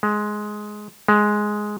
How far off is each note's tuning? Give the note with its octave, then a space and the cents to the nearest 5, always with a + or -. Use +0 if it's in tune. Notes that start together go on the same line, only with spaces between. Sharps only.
G#3 +10
G#3 +5